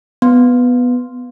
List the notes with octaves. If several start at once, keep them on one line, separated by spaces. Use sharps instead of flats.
B3